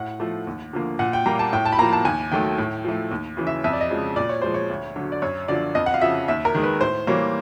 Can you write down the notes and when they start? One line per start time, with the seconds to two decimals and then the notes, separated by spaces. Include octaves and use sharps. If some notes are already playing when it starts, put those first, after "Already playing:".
Already playing: A2 F#5
0.20 F3 A3
0.47 D#2
0.73 D3 F3 A#3
0.99 A#2 F#5
1.13 G5
1.26 G3 A#3 A#5
1.39 A5
1.53 A2 G5
1.65 A5
1.72 B5
1.79 F3 A#3 A#5
1.93 A5
2.05 D#2 G#5
2.32 D#3 F#3 A3 G5
2.58 A2
2.85 F3 A3
3.11 D#2
3.37 C#3 E3
3.47 E5
3.64 F2 E5
3.73 D5
3.81 D#5
3.90 C#3 F3 G#3
4.16 A#2 D5
4.29 C#5
4.42 F3 G#3 C5
4.54 C#5
4.70 D2
4.96 D3 F#3
5.12 D5
5.22 F#2 C#5
5.48 D3 F3 D5
5.75 F2 D#5
5.86 F#5
5.94 F5
6.01 C#3 F3 E5
6.28 D#2 E5
6.45 A#4
6.55 D#3 G#3
6.63 B4
6.81 A2 C5
7.07 E3 G3 A#3 C#5